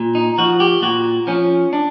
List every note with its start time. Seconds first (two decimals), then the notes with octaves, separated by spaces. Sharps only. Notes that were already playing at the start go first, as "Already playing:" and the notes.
Already playing: A#2
0.15 D#4
0.38 F3 F#4
0.60 G4
0.82 A#2 F#4
1.27 F3 C#4
1.73 D4